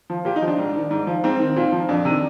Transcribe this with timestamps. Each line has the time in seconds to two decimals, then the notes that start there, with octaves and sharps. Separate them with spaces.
0.10 F3
0.25 A#2 G4
0.36 D#4
0.42 F3
0.48 D4
0.58 G#2
0.75 D#3
0.91 G#2
1.07 F3
1.24 G#2 C4
1.39 D#3
1.56 A#2
1.72 F3
1.89 F2 D4
2.05 C3 D#3